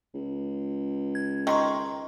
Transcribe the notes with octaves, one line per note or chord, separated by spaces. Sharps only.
C#2
G#6
D#3 A#5 C6 C#6